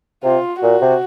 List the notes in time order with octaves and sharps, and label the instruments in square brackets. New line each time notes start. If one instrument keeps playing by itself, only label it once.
[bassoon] C3 [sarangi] F4
[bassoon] A#2 [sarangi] F#4
[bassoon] C3